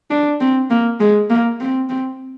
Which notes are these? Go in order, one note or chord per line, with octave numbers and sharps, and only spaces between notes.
D4
C4
A#3
G#3
A#3
C4
C4